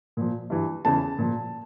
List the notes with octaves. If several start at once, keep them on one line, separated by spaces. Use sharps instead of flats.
A#2 F3
G2 E3
E2 C#3 E3 A5
A#2 F3